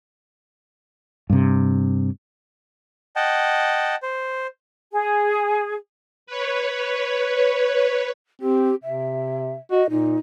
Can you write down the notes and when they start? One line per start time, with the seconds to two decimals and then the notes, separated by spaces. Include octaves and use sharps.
1.30 G2 C3
3.16 D#5 F#5 G5 A5
4.02 C5
4.92 G#4
6.27 B4 C#5
8.41 C4 G4
8.84 C3 E5
9.71 F#4 D#5
9.90 A#2 D#4